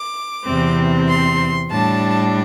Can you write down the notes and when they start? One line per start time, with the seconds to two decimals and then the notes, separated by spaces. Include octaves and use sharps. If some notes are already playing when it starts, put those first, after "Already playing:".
Already playing: D6
0.45 E2 C3 E3 C4
1.08 C6
1.70 A2 G3 D4 A5